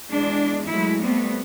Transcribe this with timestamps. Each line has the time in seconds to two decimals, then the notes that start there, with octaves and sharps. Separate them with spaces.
0.10 E2 G#3 D4
0.67 F#3 G#3 A3 E4
1.02 G3 A3 B3 C4